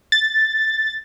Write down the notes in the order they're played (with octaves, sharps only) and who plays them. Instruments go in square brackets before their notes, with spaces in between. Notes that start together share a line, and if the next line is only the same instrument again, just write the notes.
[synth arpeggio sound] A6